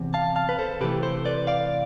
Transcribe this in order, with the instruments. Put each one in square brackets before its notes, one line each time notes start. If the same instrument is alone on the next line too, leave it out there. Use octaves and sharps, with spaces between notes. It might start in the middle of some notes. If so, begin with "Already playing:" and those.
Already playing: [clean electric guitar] E2 C3 E3
F5 A5
F5 A5
B4
A4 C5
C3 E3 A3 G4 B4
A4 C5
B4 D5
D5 F5